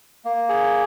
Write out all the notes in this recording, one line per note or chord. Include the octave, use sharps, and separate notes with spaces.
A#3
G#4